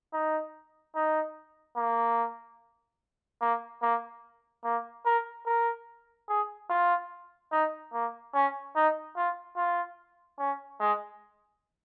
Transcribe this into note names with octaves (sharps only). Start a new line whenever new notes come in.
D#4
D#4
A#3
A#3
A#3
A#3
A#4
A#4
G#4
F4
D#4
A#3
C#4
D#4
F4
F4
C#4
G#3